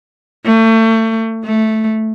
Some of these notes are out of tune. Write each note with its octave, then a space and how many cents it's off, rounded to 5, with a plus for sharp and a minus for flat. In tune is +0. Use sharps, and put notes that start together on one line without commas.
A3 +30
A3 -5